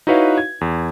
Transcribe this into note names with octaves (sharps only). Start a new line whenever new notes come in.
D#4 E4 F#4 B4 C#5 F5
G#6
E2